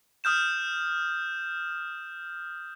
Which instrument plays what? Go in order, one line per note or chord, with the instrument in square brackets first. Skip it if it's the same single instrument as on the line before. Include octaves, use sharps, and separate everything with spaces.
[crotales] D#6 F6 G6 E7